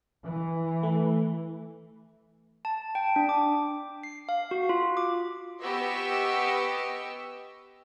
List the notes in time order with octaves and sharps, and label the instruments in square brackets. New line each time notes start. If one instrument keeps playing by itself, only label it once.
[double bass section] E3
[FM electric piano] A3
[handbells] A5
G5
D4
D6
C7
F5
F#4
F4
D6
[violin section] B3 G4 B4 D#5 C#6 E6